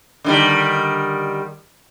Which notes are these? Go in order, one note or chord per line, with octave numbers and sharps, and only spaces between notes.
D3 D#3 G3